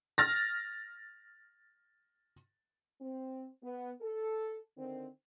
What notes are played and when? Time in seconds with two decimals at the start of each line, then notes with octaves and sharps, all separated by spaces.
0.18 F6 A6 A#6
3.01 C4
3.63 B3
4.01 A4
4.77 D3 D#3 C4